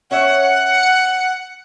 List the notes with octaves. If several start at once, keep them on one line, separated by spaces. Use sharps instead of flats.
C#4 C#5 E5 F#5